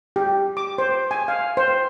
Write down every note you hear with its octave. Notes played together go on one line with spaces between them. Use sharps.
G4
D6
C5
G#5
F5
C5